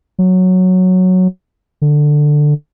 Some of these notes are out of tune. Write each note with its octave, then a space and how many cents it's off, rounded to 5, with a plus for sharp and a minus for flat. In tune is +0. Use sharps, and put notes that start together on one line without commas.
F#3 -5
D3 +10